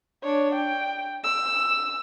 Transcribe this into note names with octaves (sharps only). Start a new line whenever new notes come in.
D4 C#5
G5
E6